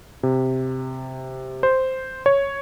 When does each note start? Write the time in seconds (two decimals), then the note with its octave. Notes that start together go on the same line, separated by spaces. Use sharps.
0.23 C3
1.63 C5
2.26 C#5